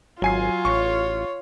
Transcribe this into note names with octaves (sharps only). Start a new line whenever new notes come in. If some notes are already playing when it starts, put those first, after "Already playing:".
G#1 F#3 F4 G#5 C7
A1 C#5 C#6